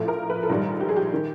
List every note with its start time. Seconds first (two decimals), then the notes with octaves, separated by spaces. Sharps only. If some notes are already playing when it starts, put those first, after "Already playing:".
Already playing: A#1 A2 F3 A3
0.08 A#4
0.30 B4
0.43 A4
0.49 A#1 G#2 D#3 G3 A#4
0.80 G4
0.89 G#4
0.96 G4
1.14 D#3